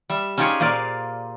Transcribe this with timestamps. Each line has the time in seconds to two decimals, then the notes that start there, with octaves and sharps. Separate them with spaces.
0.09 G3 E5
0.37 C#4 D#4 F4 G4 G#4 C#5
0.60 A#2 A#3 C5 D5 F5